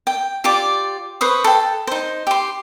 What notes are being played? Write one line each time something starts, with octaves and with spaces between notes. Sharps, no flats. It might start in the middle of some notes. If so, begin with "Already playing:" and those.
G5
F4 G4 D5 D6
B4 C5 C#6 D#6
A4 G5
D#4 C5
G4 C6